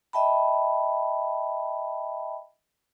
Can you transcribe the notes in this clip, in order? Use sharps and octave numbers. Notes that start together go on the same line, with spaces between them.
D#5 E5 G5 A5 B5